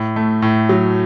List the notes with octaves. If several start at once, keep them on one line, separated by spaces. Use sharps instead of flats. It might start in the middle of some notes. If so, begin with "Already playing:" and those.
Already playing: A2
A3
A2
F#3